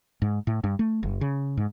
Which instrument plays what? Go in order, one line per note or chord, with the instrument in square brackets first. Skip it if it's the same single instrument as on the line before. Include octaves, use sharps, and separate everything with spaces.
[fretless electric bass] G#2
A2
G2
A3
F#1
C#3
G#2